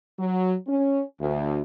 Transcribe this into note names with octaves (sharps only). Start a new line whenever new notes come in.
F#3
C#4
D2